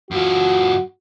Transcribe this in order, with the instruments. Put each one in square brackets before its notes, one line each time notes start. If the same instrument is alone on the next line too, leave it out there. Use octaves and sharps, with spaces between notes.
[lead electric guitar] F#2 F4 [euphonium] F#4